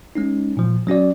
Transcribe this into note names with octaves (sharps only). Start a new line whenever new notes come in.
G#3 C#4 D#4
A#2 F3
F#3 C#4 F#4 D5